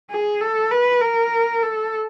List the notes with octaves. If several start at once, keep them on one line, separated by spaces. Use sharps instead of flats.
G#4
A4
B4
A#4
A4